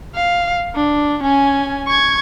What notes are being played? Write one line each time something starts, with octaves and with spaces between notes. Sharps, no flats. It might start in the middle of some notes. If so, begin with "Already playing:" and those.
F5
D4
C#4 G#5
C#6 G#6